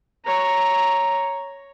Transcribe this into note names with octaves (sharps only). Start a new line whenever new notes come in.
C#5 A#5